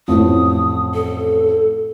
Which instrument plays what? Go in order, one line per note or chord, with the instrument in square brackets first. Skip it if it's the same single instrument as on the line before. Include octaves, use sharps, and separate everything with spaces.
[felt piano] A1 F2 A2 [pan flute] D#6
[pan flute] A4